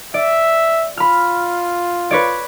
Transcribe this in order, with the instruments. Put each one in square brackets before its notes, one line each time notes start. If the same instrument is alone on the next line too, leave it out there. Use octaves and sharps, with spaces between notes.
[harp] D5 [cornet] E5
[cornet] F4 [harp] B5 F6
[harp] B4 C#5 D5